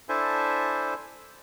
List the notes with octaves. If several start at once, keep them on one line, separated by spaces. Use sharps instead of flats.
D4 E4 A4 C5 E5 G#5